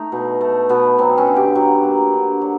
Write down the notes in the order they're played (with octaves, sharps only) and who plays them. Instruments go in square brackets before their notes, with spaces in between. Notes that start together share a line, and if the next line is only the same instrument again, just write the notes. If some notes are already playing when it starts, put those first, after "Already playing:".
Already playing: [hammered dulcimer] A3 D#4
B2
A3
B2 B3
F#3 C4
C#4
D3
G4
F#3
A#3
D3
F#3